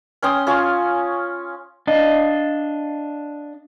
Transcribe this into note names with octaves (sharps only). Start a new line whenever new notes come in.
C#4 G5 C6 D#6
C#4 F4 G#5 C#6
D4 D5 D#5 F5